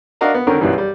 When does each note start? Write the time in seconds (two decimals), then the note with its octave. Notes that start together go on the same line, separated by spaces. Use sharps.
0.21 D4 F#4 A#4 D#5 F5 A#5
0.34 B3
0.47 D3 D#3 C4 C#4 F#4 A#4
0.61 B1 F#2 B2 E3 G3
0.78 G3